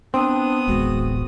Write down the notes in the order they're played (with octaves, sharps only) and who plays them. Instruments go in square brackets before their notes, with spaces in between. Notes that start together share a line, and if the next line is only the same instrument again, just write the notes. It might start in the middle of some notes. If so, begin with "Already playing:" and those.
[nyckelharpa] B3 D#6 [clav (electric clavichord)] C4 [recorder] D4
[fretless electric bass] D1 A1 G#3 [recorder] F#4